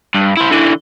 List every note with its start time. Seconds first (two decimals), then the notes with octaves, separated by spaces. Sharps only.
0.14 G2
0.37 E4 C5
0.51 D3 E3